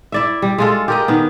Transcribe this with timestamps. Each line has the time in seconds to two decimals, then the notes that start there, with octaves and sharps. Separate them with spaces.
0.12 E4 D5 E5
0.42 G3
0.58 G#3 F4 A4
0.88 G4 A#4 D#5
1.08 D#3 B3